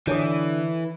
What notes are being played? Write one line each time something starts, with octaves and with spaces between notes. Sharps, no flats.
D3 E3 C#5 G#5 D#6